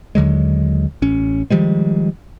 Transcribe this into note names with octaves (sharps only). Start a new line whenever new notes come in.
D#2 D3 F#3 G#3
A1 C#4
D#3 F3 G3 G#3